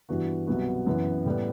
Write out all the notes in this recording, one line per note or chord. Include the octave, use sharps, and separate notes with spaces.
G2 E3 B3 F#4
C2 B2 F#3 B3 F#4
F#2 E3 B3
A2 G3 B3